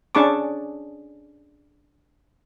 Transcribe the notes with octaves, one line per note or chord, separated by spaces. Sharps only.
C#4 D4 G#4 A5 C#6 D6